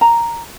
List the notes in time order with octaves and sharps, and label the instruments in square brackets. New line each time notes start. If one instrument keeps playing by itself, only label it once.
[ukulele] A#5